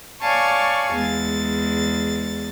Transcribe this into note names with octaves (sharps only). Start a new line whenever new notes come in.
C#5 D5 F5 G#5 A5 C#6
E2 G#3 A6